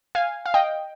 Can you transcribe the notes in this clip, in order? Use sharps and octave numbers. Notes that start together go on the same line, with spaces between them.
F5 G#5
F5
D#5 G5